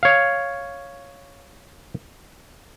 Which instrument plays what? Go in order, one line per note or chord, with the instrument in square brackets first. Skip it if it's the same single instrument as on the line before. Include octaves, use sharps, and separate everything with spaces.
[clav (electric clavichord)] C#5 F5